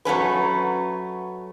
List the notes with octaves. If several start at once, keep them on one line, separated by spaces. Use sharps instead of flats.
F#3 A3 C#4 B4